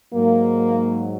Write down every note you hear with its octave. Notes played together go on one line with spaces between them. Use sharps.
G#2 F#3 A#3